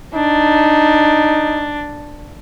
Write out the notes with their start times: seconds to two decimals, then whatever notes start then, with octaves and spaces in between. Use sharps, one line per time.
0.14 D4 D#4